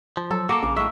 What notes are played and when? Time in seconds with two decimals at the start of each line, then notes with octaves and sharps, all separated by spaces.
0.17 F3
0.31 F#3 A4
0.49 A#3 F#4 G4 A4 D6
0.63 A#1 C#3 D6
0.76 A2 G#3 E5 C#6